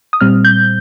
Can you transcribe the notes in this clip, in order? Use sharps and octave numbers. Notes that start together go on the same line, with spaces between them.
D#6
A#2 G3 C4 F6
G6